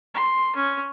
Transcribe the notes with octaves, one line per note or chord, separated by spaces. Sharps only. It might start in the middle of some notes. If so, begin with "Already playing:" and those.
C6
C#4